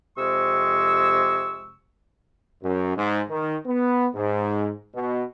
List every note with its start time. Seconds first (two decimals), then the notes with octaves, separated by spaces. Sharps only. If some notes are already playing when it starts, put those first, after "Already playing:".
0.17 F2 C3 G#3 C#6 E6
2.63 F#2
2.97 G#2
3.29 D#3
3.66 B3
4.16 G#2
4.94 B2